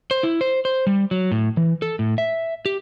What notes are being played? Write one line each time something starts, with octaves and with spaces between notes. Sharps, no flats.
C5
E4
C5
C5
G3
F#3
A2
E3
A4
A2
E5
G4